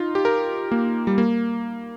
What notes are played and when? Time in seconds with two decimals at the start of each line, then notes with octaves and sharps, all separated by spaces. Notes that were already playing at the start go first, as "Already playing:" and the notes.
Already playing: D#4 F4
0.15 G4
0.25 A#4
0.71 A#3
1.07 G3
1.18 A#3